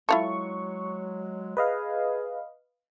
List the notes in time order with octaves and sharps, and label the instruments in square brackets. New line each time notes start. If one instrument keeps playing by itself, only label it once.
[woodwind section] F#3 G#3 [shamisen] E4 F4 A4 [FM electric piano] C#6
[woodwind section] G#4 [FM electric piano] B4 D#5 F5